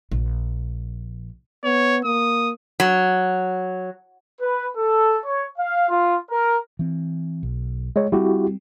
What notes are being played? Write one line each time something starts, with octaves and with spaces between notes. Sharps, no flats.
A#1
B3 C#5
A#3 D#6
F#3
B4
A4
C#5
F5
F4
A#4
E3 C4
B1
G#3 C#5
G3 A#3 C4 E4 F#4 G4